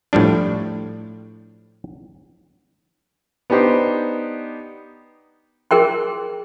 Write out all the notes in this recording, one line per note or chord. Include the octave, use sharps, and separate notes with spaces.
A2 F3 G3 D4
B3 D4 D#4 G4 C5
G#4 A#4 G5 C6